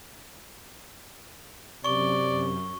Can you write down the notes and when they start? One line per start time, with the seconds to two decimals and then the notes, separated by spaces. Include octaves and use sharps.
1.84 F#2 C3 D5 C#6 G7